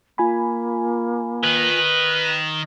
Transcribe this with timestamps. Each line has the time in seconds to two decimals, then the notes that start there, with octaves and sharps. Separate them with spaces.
0.18 A#3 F4 G#5 B5
1.43 D#3 B4